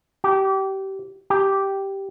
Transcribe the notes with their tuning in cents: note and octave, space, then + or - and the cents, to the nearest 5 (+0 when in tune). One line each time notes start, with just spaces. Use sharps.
G4 -25
G4 -5